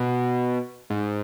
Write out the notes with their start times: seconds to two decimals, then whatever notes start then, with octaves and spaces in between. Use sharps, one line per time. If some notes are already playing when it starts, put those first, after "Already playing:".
Already playing: B2
0.90 G#2